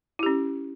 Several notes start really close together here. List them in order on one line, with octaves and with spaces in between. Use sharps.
E4 G4 C#4